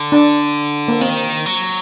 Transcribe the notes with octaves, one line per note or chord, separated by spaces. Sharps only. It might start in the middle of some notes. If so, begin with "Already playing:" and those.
Already playing: D3
D4
A#3
D#3 C4
F#3